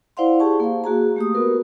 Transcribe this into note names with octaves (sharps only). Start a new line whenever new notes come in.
E4 C5 D5 F5 F#5 C6
G4 G#4 A5 C#6
A#3 F5
A#3 F#4 G#4 A#5
A3 G4 D#6
B3 F#4 A#4 B4